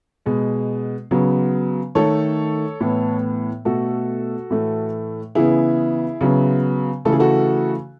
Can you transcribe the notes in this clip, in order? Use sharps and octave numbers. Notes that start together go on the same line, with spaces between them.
B2 G#3 B3
C#3 F#3 B3
D#3 A3 A4 C#5
A2 E3 B3
B2 A3 F#4 A4
A2 E3 A3
C#3 E3 B3 E4 G#4
C#3 F#3 B3
C#3 E3 A3 A4
G#4
F#4 A4